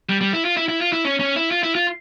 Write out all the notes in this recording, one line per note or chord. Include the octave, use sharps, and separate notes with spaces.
G3
G3
E4
F4
E4
E4
F4
E4
C#4
C#4
E4
F4
E4
F4